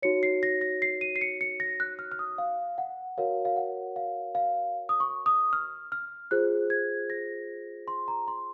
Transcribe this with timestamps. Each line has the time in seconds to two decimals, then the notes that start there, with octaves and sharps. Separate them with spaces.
0.02 D#4 F#4 C#5 C#7
0.23 C7
0.43 A#6
0.61 A#6
0.82 C7
1.01 D#7
1.16 C7
1.21 C#7
1.41 C#7
1.60 A#6
1.80 F#6
1.99 F6
2.12 F6
2.19 D#6
2.38 F5
2.78 F#5
3.18 F#4 A#4 C#5 F5
3.45 F5
3.57 F#5
3.96 F5
4.35 F5
4.89 D#6
5.00 C#6
5.26 D#6
5.53 F6
5.92 F6
6.31 F4 G#4 C5 F#6
6.70 G#6
7.10 A#6
7.88 C6
8.08 A#5
8.28 C6